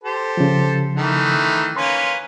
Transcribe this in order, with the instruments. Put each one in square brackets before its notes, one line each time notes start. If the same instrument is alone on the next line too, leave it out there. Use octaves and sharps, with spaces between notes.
[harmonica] G4 A4 C5
[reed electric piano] C#3 F3
[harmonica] D#3 E3 A3
[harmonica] A#3 C#4 B4 [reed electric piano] C6